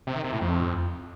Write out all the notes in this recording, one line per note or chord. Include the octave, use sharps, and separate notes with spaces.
C3
D#3
C3
A2
F2